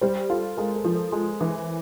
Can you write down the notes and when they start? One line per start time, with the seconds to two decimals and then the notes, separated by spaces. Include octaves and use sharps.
0.01 G3 C5
0.29 F4 A4
0.57 G#3 A#4
0.76 A4
0.84 F3
0.94 A4
1.12 G#3
1.41 E3